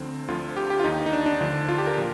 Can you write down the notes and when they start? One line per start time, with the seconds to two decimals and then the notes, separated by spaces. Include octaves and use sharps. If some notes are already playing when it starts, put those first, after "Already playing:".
Already playing: D2 D3 F3 C4
0.28 D2 D3 F3 F4
0.57 G4
0.70 G4
0.80 F4
0.84 D#2 D#3 D#4
1.06 D#4
1.13 D4
1.26 D4
1.41 D2 D3 F3
1.69 F4
1.78 G4
1.87 A#4
1.97 A#2 F3